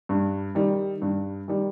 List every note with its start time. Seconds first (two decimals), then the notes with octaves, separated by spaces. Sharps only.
0.09 G2
0.55 D#3 G3
1.02 G2
1.48 D#3 G3